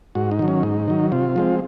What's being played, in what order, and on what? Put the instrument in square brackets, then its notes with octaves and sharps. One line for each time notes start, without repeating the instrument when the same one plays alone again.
[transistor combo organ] G#2 F#4
D#4
D#3 F#3
C#4
G#2 D#4
D#3 F#3
C3 F4
F3 G#3 C4